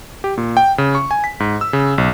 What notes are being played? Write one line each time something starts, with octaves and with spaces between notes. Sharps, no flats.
G4
A#2
G5
C#3
C#6
G#5
B6
G#2
E6
C#3
B1